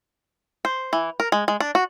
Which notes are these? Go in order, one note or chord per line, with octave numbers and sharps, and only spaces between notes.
C5
E3
A#4
G#3
G#3
D4
F#4